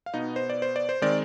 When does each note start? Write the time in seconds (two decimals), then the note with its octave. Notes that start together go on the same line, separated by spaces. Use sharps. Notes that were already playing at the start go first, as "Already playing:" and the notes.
0.06 F5
0.14 B2 B3 D#4 D#5
0.36 C5
0.50 D5
0.62 C5
0.76 D5
0.89 C5
1.02 D#3 G#3 C4 D5